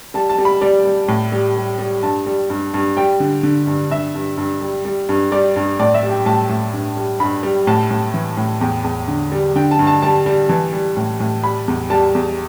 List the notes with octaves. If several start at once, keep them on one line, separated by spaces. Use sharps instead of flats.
G3 A5
A5
G3
B5
G3 D5
G3
A2
G3
G3
G3
G2 A5
G3
G2
G2
G3 G5
D3
D3
G2
G2 E5
G2
G2
G3
G3
G2
G3 D5
G2
A2 D5
E5
G3
G5
A2 A5
A2
G2
G3
G2 B5
G3
A2 A5
A2
E3
A2
E2 G5
E2
D3
G3
D3 G5
A5
G2
A5
G3 A5
G3
E3 A5
G3
A2
A2
G3 B5
E2
G3 A5
E2